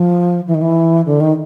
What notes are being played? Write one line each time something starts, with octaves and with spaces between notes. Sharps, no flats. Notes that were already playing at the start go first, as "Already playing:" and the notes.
Already playing: F3
E3
D#3
E3
D3
D#3